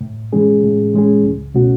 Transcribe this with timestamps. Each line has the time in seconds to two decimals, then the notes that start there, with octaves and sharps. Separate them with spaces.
0.01 A2
0.33 E3 G#3 C#4 G#4
0.63 A2
0.94 E3 G#3 C#4 G#4
1.23 C#2
1.55 B2 A3 C#4 F#4